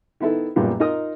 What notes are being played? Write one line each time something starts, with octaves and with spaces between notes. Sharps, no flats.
D#3 B3 E4 A4
A#1 F#2 A#2 G3 B3 F4
D#4 F4 A#4 D#5 D#6